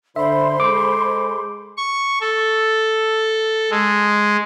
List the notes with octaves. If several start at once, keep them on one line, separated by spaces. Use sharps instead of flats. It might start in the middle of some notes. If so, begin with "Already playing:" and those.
D3 C5 E5 B5 C6
G#3 A4 D6
C#6
A4
G#3